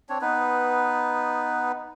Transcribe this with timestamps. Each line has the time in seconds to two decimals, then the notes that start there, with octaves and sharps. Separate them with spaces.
0.09 C4 D4 C#5
0.21 B3 D#4 B4